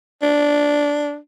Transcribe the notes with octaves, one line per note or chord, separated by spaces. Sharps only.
D4